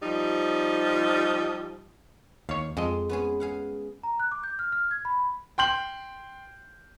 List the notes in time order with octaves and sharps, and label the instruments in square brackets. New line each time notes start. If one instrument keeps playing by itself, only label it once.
[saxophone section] F3 G3 D#4
[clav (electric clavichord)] D#2 C#5 [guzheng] F5
[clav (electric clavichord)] F2 D#5 [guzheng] G#3
[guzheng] B3 C#4 G#4
G#4 F5 F#5
[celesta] A#5
F#6
D6
G6
F6
F6
G#6
B5
[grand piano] G5 C6 G6 F#7